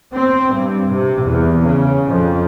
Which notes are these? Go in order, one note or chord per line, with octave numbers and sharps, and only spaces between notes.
C4
G2
C3
E2
C#3
F2